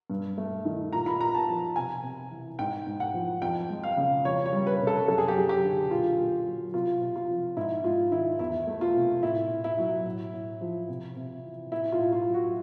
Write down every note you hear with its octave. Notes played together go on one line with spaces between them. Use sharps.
G2
A3
D#3
A#2 A#5
B5
A#2 A#5
A5
F3
C3 G#5
C3
E3
G#2 G5
G#2
F#5
F3
F2 G5
G#3
F5
C#3
F2 C#5
C#5
G3
B4
C3
A4
F#2 A4
G#4
G4
F#2 G#4
G4
D3
A#2 F4
A#2
F#3
C3 F4
C3
F4
F3
G#2 E4
G#2 F4
D#3 E4
E2 E4
A3
F4
C3
A2 E4
A2
E4
F#3
A2
A2
F3
C3
C3
E3
A2 E4
F4
A2
F4
F#3
F#4